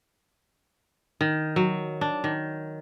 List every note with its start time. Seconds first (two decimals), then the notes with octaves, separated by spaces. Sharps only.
1.21 D#3
1.56 F#3
2.01 D4
2.24 D#3